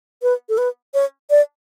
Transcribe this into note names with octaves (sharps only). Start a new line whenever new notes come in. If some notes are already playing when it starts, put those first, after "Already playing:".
B4
A4
B4
C#5
D5